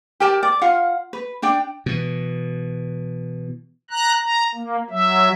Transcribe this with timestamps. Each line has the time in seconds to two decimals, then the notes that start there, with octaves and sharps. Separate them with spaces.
0.20 G4 A#4 G5 A5
0.43 D5
0.62 F4 F5 F#5
1.13 B4
1.42 D4 D5 G5
1.86 B2 E3
3.91 A#5 F#6
4.22 A#5
4.55 A#3
4.90 F#3 E5